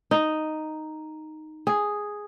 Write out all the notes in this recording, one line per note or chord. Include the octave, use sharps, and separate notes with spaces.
D#4
G#4